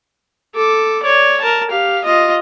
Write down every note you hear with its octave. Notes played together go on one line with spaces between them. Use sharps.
A4 D6
C#5 D5
A#4 A5
G4 F5
F4 D#5